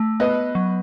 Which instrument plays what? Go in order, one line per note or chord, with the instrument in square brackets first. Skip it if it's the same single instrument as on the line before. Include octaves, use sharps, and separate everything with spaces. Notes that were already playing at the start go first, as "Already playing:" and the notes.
Already playing: [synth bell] A3
[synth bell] B3 [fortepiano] B4 D#5
[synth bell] F#3